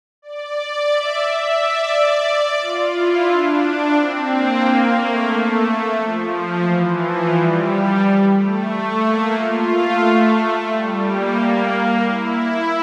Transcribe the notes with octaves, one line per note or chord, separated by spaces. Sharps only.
D5
E5
D5
F4
E4
D4
C4
A#3
A3
F3
E3
F3
G3
A3
A#3
F4
A3
G3
A#3
E4